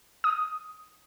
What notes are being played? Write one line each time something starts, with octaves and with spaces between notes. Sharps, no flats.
D#6